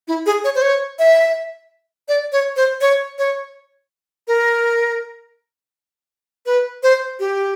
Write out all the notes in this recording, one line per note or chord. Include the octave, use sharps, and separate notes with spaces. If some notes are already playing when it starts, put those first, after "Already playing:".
E4
G#4
C#5
C5
C#5
E5
D5
C#5
C5
C#5
C#5
A#4
B4
C5
G4